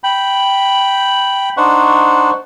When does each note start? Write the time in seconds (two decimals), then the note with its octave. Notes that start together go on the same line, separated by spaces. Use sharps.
0.04 G5 B5
1.57 D4 D#4 C5 F#5 C#6